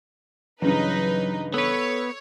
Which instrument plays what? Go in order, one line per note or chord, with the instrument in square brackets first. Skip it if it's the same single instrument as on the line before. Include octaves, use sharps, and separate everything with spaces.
[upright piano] G2 C#3 E3 [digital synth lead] F#3 [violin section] D#4 B4
[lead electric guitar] B3 B4 [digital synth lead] A4 [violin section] C#5